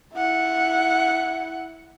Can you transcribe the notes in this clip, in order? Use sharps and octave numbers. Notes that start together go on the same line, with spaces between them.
E4 F#5